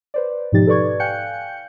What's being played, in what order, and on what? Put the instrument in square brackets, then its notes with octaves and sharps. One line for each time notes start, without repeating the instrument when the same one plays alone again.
[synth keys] B4 C5 D5
G#2 B2 F3 D#4 G4 A6
A4 B4 D5 C#6 G#6
F5 G5 G#5 F#6 G6 C#7